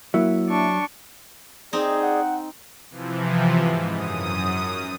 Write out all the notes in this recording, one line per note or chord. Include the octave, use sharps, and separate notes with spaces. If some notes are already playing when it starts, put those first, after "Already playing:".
F#3 A#3 E4 E5
D4 C#6
C4 D#4 G#4 D5
F#5
C3 E3 F3
G#2
F#2 D#6